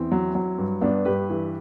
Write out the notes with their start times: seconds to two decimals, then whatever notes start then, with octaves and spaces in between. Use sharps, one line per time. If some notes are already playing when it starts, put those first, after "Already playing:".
Already playing: E2 C4 E4
0.12 F#3
0.35 F#3
0.58 G2
0.81 G2 B3 D4
1.05 G2 G4 B4
1.30 E3